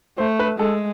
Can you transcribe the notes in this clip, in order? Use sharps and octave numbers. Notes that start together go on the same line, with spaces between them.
A3 C5
B4
G#3 A4